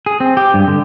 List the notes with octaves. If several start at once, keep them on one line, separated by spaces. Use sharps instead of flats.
G#4
C4
G4
G2
D3